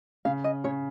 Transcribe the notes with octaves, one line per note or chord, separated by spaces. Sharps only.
C#3 F5
D#5
C#3 C#5